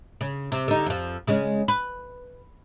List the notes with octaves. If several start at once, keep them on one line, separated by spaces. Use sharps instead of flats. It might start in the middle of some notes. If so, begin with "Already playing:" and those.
C#3
C3
D3 D#4
F2 F3
C#3 G#3 C#4
B4